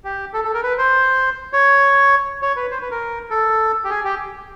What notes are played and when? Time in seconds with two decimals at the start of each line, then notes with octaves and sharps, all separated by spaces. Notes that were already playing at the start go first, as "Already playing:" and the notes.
0.04 G4
0.33 A4
0.45 A4
0.54 A#4
0.63 B4
0.78 C5
1.53 C#5
2.42 C#5
2.56 B4
2.71 C5
2.82 B4
2.91 A#4
3.30 A4
3.84 G4
3.90 G#4
4.04 G4